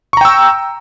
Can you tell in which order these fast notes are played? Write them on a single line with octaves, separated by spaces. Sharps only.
C#6 A#5 G5 E6